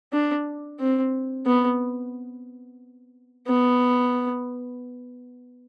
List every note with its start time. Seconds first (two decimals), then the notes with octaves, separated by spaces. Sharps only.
0.13 D4
0.80 C4
1.46 B3
3.48 B3